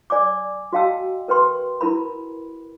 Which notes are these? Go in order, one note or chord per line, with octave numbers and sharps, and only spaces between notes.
D5 G#5 D6
F#4 D#5 F5 G5 A5 E6
A#4 B4 G5 C6
E4 A#4 B5